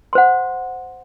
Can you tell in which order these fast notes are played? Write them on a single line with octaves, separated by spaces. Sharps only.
C6 C5 F#5